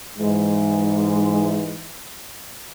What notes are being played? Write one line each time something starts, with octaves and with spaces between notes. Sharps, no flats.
G#2 E3 G#3